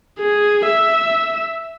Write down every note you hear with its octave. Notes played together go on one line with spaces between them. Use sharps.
G#4
E5